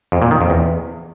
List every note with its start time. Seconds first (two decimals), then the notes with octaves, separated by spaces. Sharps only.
0.12 F2
0.22 A#2
0.31 D#3
0.41 F2
0.50 E2